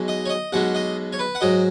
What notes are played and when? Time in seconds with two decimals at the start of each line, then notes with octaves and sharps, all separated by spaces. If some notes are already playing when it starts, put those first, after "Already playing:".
Already playing: B1 B2 G#3
0.08 D#5
0.26 C#5
0.29 D#5
0.53 B1 B2 G#3 F#5
0.75 D#5
1.13 C#5
1.19 B4
1.35 F#5
1.41 G#2 F#3 D#5